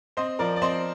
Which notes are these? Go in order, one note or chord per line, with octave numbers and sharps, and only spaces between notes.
C4 C5 D#5
F3 A#4 D5
D5
C4 C5 D#5